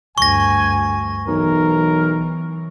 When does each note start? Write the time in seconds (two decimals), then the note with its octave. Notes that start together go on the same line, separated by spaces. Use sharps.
0.18 D2 G2 G#5 C#6 A#6
1.27 B1 E3 A#4